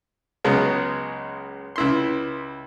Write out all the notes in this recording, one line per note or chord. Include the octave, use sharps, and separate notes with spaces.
C#2 C#3 F#3 G#3 B3
C#2 E4 C6